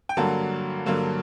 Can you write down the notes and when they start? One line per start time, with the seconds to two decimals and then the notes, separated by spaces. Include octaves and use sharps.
0.09 G5
0.17 G2 D3 F#3 A#3 F#5 A5
0.86 G2 D3 F#3 A#3